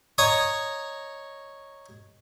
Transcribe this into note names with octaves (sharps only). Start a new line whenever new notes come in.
C#5 D#5 A#5 C#6 D#6